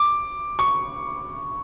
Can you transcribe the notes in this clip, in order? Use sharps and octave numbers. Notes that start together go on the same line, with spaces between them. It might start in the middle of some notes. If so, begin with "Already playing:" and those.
Already playing: D6
C#6